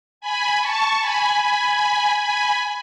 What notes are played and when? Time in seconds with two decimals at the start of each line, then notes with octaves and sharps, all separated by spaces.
0.21 G#5 B5
0.61 A5 C#6
1.00 G#5 B5
1.41 G#5 B5
2.20 G#5 B5